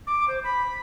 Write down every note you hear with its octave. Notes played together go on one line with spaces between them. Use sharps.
D6
C5
B5